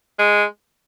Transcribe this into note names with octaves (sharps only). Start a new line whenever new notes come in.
G#3